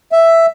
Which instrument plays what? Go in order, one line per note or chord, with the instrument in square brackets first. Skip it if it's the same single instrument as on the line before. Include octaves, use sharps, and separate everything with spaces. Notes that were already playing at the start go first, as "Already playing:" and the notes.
[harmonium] E5